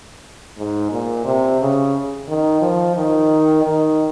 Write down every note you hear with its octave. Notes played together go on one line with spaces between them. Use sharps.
G#2
A#2
C3
C#3
D#3
F3
D#3
D#3